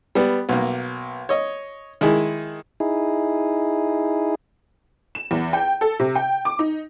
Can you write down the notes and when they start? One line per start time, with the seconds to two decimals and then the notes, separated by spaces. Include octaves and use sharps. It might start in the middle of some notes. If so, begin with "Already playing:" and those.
0.15 G3 B3
0.49 B1 A#3
1.29 C#5 D#5
2.01 D#3 G#3 E4 G#4
2.80 D#4 E4 G#4
5.15 E7
5.31 E2
5.53 G5
5.81 A4
5.99 C3
6.15 G5
6.45 D6
6.59 D#4